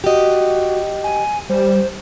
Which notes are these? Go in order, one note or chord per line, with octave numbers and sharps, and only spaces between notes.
F#4 G4 D#5
G#5
G3 C5